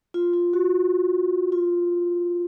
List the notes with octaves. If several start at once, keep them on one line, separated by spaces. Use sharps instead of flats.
F4
F4
F#4
F4